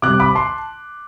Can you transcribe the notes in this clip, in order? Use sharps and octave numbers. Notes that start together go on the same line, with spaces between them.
C3 D6 F#6
G3
B5 D6
A5 C6